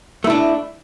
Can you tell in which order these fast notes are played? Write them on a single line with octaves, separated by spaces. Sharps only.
A3 E4 D4